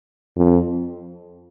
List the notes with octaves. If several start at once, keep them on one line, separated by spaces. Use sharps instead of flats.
F2